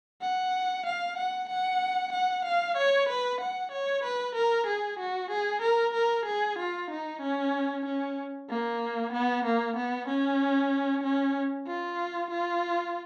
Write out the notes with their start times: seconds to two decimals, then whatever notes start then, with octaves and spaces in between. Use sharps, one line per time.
0.22 F#5
0.86 F5
1.18 F#5
1.49 F#5
2.13 F#5
2.45 F5
2.77 C#5
3.09 B4
3.41 F#5
3.72 C#5
4.04 B4
4.35 A#4
4.67 G#4
5.00 F#4
5.31 G#4
5.62 A#4
5.94 A#4
6.26 G#4
6.59 F4
6.91 D#4
7.22 C#4
7.86 C#4
8.50 A#3
9.13 B3
9.45 A#3
9.76 B3
10.08 C#4
11.04 C#4
11.67 F4
12.31 F4